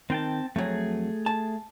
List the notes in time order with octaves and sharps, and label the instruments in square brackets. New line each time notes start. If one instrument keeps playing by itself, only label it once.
[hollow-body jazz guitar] D#3 [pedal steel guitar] C4 G5 A5
[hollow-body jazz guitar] F2 F#3 [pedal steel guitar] A3 G#4
[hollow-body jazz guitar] A5